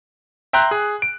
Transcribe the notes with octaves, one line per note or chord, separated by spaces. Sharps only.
E5 G5 A#5 C6 F#6
G#4
D7